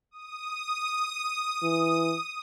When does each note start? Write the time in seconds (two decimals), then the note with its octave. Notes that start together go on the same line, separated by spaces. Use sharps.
0.11 D#6
1.63 E3